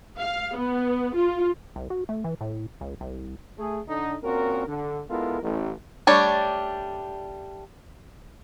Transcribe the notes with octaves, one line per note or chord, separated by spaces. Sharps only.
F5
B3
F4
C2
F#4
A3
E3
A2
C#2
C2
A3 G#4
D3 D#4
A#2 C4 C#4 F#4 A#4
D3
G#3 B3 E4 F4 A4 A#4
A1
G3 A3 D4 C#5 D5